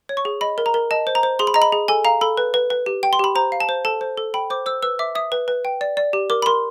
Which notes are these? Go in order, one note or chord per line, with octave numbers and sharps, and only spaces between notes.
C#5
C#6
G#4
D#5 B5
A#4
A#5
A#4
D#5 A5
C5
A#5
C5
G#4 C6
B5
D#5 A#5
B5
G#4
A4 G#5
F5 A#5
A4 B5
B4
B4
B4
G4
G5
C6
G4 B5
C5 A#5
F5
A5
C5
A4 A5
C5
A4
G5 B5
C5 D6
C5 E6
B4 E6
E5 D6
E5 D#6
B4
B4
G5
D5
D5
G4
A#4 D6
B5
A#4 C6